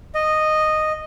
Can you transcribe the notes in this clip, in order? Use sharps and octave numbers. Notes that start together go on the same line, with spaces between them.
D#5